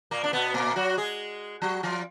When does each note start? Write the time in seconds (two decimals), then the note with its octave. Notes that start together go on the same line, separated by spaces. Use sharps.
0.11 A#2 A#3
0.24 D4
0.33 B2 B3
0.54 A#2 A#3
0.76 F#3 F#4
0.97 G#3 G#4
1.62 F#3 F#4
1.83 F3 F4